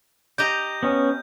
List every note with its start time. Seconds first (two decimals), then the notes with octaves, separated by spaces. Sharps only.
0.38 G4 D#5 A#5 G6
0.83 B3 C#4